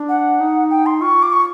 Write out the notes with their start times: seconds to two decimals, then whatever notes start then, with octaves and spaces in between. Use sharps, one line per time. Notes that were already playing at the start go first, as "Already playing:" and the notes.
Already playing: D4
0.09 F#5
0.40 D#4
0.71 G5
0.86 C6
1.01 F4 C#6
1.23 D6
1.33 C#6